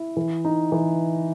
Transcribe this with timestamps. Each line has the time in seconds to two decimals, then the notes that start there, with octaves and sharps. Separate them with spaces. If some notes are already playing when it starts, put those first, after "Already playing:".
Already playing: E4
0.17 E3
0.45 D#4
0.72 E3